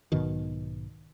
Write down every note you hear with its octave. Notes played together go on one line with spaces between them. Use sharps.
B1 G#2 B2 D#3